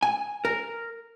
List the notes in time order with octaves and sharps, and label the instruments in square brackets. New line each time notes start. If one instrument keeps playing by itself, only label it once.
[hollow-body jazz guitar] G#5
A#4